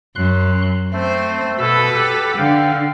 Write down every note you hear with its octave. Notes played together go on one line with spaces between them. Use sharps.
F#2 C6 F#6
A3 C4 C5
B2 A4 B4 E6
G4 F#5
D3 F5 G5